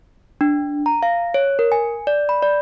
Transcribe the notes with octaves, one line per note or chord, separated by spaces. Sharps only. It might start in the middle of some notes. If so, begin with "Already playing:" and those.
D4
A#5
F5
C#5
A#4
G#5
D5
B5
D5